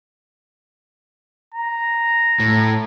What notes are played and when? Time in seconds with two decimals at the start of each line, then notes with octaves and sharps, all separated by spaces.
1.54 A#5
2.40 A2